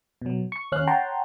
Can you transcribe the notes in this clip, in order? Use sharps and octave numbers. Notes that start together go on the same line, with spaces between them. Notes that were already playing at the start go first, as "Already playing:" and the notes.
B2 F#3
C#6
D#2 C#4 F5 F#6
C#5 F#5 G5 A5 A#5 C6